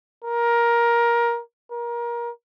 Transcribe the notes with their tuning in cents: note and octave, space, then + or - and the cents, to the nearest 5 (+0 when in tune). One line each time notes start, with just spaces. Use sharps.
A#4 +15
A#4 +25